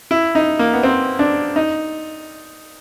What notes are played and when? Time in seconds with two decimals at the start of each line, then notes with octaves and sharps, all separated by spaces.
0.11 E4
0.35 D#4
0.59 A#3
0.73 B3
0.83 C4
1.19 D4
1.56 D#4